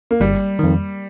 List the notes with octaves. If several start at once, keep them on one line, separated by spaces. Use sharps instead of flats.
A#3
G1 G3
F2 D#3